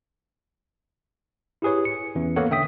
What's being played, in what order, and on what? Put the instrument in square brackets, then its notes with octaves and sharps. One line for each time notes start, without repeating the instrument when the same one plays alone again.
[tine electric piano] E4 G4 G#4 B4 C#5
C#7
E2 E3 C#4
A#3 B3 A4 A#4 C#5 F#5
D3 E5 G5 D#6 B6